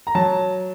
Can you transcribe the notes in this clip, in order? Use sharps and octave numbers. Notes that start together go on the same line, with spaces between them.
A#5
F#3 A5